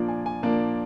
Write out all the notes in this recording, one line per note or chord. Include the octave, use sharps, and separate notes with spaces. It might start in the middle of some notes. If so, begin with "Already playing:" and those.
Already playing: A#2 F3 A#3 D4
G#5
G#5
A#2 F3 A#3 D4 A5